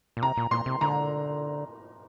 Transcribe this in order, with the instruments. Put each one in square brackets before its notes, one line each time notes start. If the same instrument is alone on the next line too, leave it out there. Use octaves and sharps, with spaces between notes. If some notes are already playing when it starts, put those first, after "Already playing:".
[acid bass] A#2
[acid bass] C3 [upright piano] A#5
[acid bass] A#2
[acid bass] A#2 [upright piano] C6
[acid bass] C3
[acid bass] D3 [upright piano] A#5